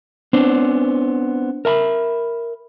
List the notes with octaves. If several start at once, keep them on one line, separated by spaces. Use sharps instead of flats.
B3 C4 D4 C5
A#4 E5 A#5 B5